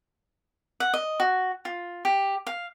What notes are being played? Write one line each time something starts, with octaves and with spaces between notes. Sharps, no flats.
F#5
D#5
F#4
F4
G4
F5